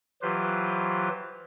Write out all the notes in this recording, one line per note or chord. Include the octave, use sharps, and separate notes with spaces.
E3 F#3 F4 G4 B4 C5